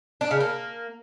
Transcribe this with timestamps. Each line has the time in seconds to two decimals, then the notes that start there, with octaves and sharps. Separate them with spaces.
0.21 D4
0.31 C#3
0.40 A#3